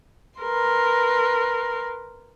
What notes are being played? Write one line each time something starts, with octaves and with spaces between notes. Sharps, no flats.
A#4 B4 C6